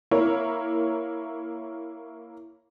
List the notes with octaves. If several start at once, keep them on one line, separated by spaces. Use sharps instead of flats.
A#3 E4 A#4 C#5